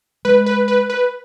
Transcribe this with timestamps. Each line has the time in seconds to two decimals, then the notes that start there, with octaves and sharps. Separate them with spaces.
0.25 G#3 B4
0.46 B4
0.68 B4
0.90 B4